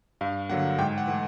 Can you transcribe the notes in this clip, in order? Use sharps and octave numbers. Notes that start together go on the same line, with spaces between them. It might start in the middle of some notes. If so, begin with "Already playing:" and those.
G2 F5
D3 F#3 A#3 F#5
G#2 G5
F#5
E3 A3